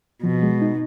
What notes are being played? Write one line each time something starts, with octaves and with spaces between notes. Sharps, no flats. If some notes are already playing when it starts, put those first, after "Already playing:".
B2 F3
G#3
D#4